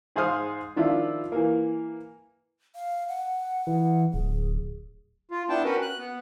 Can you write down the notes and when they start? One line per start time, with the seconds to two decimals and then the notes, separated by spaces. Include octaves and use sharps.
0.16 G#2 G#4 C5 F5 D#6 F6
0.76 D#3 F3 D4 E4 F4
1.32 E3 A#3
2.75 F5
3.08 F#5
3.67 E3
4.13 D1 G#4
5.31 F4
5.49 B3 D4 E4 G5 A5
5.64 C#4 F#4 A#4 B4
5.82 F#6
5.99 B3